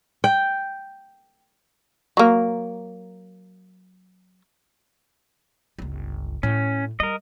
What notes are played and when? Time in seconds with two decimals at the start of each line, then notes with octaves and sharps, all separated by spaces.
0.24 G5
2.17 F#3 A#3
5.79 G1 C#2
6.43 A2 A3 C#4
7.00 G3 A#4 D#5